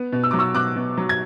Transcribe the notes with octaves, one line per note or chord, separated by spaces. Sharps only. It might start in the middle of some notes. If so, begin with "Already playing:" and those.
Already playing: B3
B2
E6
F#3 D6
C#6 E6
B2 D6 F#6
B2
F#3
G#6